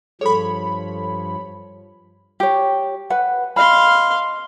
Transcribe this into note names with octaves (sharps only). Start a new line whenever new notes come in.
G2 F3 G#4 A4 C5 C#5 B5
G4 C#5
B4 F#5
D#5 F5 B5 C6